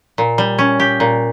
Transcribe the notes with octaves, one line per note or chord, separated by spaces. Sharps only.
A#2
G3
C#4
G4
A#2